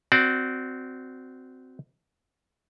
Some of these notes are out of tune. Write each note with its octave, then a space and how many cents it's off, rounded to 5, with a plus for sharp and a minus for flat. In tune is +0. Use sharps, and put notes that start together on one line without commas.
C4 -15 F#4 +0 D5 +0